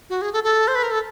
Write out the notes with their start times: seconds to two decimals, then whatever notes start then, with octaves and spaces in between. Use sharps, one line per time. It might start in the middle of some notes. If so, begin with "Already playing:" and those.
0.10 F#4
0.22 G#4
0.33 A4
0.44 A4
0.68 C5
0.75 B4
0.83 A#4
0.91 A4